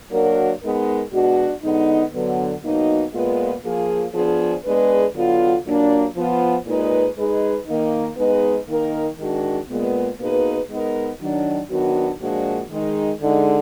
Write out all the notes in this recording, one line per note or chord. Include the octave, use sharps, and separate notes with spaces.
F#3 A#3 D4 F#4 A#4
G#3 B3 D#4 A#4
B2 G#3 D4 F#4
D3 G#3 B3 D#4
D3 F#3 B3
B2 F#3 A#3 D#4
A#2 G#3 B3 F4 B4
F3 A#3 F4 G#4
F3 B3 D4 G#4
G#3 B3 D4 G#4 B4
D3 F#3 B3 F4
A#2 F#3 A#3 D4
F3 B3 F4
A#2 G#3 D#4 G#4 B4
G#3 D#4 G#4 B4
D#3 A#3 D#4
G#3 B3 D#4 G#4 B4
D#3 A#3 D#4 A#4
D#3 G#3 D4 F#4
A#2 G#3 B3
B2 A#3 D#4 G#4 B4
G#3 B3 D#4 A#4
D#3 F#3 D4
D#3 F#3 B3 D4 F#4
A#2 F3 G#3 D4 F#4
D#3 G#3 D#4
D3 G#3 D#4